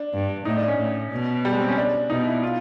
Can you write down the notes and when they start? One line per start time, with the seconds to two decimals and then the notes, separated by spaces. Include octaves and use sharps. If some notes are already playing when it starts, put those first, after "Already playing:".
Already playing: D4
0.14 G2
0.45 A2 D#4
0.57 D4
0.68 C#4
0.78 A2
1.11 B2
1.45 G3
1.53 G#3
1.60 C4
1.68 C#4
1.78 D4
2.10 B2 D#4
2.27 E4
2.43 F4